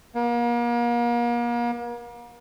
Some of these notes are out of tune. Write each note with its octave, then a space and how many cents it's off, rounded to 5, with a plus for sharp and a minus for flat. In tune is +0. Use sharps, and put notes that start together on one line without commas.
A#3 +40